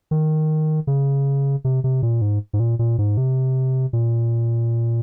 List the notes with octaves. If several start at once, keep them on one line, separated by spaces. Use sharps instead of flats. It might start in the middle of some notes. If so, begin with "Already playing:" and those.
D#3
C#3
C3
C3
A#2
G#2
G#2
A#2
A#2
G#2
C3
A#2